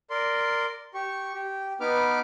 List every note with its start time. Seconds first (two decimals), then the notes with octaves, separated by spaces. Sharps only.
0.10 A#4 D5 C6
0.94 G4 C#6
1.34 G4
1.81 B3 D#4 B4 D6 F6